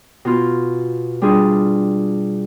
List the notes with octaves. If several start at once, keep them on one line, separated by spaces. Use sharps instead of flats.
B2 F4
G3 D4 F4 G#4